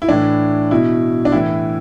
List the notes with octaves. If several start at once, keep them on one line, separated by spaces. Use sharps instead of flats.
E4
A2 E3 D4
B2 E4
D4
A2 E3 E4